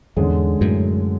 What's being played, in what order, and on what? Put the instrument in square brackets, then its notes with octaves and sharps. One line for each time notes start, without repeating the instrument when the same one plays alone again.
[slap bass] E2 G#2 [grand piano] D3 G#3 C#4 G#4
[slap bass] F#2 A2